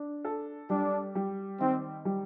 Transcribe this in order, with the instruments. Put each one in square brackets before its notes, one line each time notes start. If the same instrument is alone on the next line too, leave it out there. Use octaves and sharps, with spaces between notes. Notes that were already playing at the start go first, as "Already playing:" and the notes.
Already playing: [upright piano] D4
A4
[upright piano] G3 [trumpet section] D4
[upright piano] G3
[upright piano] D#3 [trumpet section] C4
[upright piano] G3